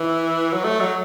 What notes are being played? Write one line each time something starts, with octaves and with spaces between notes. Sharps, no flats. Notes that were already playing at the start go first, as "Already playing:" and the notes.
Already playing: E3
F#3
A3
F#3